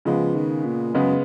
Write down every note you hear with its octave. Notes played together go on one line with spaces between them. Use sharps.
C#3 F3 G#3 B3
D#3
A#2
F#2 C#3 G#3 B3